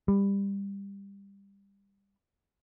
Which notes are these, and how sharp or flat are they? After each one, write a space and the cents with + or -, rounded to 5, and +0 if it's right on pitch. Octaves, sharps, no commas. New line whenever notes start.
G3 +20